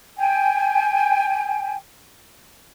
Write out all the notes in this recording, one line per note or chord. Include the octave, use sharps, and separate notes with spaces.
G5 G#5